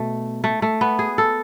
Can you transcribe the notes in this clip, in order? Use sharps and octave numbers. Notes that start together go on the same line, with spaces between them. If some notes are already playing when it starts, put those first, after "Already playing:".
Already playing: B2 A3
A3
A3
B3
G#4
A4